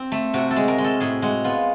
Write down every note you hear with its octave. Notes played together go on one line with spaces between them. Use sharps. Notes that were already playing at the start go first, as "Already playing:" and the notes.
Already playing: C4
A3
C3 F#4
A4
G#3
A#4
G#3
A4
A2 G#4
G#3 F#4
B3 F4